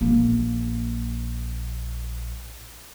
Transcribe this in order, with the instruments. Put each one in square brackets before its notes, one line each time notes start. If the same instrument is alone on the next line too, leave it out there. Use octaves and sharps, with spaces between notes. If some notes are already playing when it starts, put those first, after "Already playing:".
[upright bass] A#1 A#3